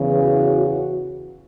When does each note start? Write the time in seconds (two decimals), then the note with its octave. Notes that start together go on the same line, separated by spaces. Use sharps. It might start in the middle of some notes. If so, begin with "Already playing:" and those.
Already playing: E2 C#3 E3
0.22 F#4
0.59 F#4